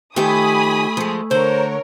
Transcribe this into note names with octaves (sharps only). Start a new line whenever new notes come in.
D#3 F3 A3 G4 G#5 B5 D#6
F3 G#3
D3 A#4 C5 C#5